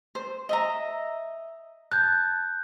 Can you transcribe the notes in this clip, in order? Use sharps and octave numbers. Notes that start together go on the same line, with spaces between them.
C5
D#5 E5 A#5
A5 F#6 G6